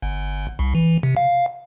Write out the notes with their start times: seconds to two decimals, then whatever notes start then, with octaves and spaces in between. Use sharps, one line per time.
0.02 G1
0.59 C2
0.75 E3
1.03 C3
1.17 F5